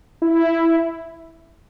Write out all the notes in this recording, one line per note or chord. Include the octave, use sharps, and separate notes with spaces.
E4